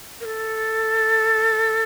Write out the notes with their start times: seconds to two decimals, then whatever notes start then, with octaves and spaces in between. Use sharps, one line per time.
0.21 A#4
0.25 A4